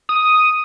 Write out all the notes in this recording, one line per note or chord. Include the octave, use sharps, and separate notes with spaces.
D#6